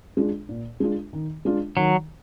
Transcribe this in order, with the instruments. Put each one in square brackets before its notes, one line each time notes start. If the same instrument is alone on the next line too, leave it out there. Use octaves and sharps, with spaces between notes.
[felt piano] G#3 D4 F4
A#2
G#3 D4 F4
D#3
G#3 D4 F4
[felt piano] D#3 [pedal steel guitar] F#3